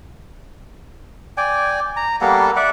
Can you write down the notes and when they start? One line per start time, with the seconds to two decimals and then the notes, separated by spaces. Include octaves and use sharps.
1.37 D5 G5 G#5
1.96 A#5
2.21 G3 A#3 B3 A4
2.56 D5 E5 F#5